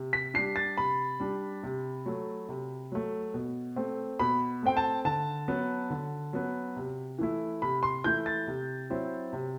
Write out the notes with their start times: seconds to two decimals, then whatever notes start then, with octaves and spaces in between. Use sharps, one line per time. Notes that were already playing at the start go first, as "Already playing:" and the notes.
Already playing: C3
0.13 B6
0.34 G3 D4 C7
0.56 A6
0.77 C3 B5
1.20 G3 D4
1.63 C3
2.06 F#3 A3
2.49 C3
2.92 F#3 A3
3.34 B2
3.76 A3 C4
4.19 B2 B5
4.63 A3 C4 G5
4.77 A5
5.05 D3 A5
5.48 F#3 B3
5.90 D3
6.33 F#3 B3
6.76 C3
7.19 E3 A3 E4
7.62 C3 B5
7.83 C6
8.04 E3 A3 E4 G6
8.26 A6
8.47 C3
8.90 F#3 C4 E4
9.33 C3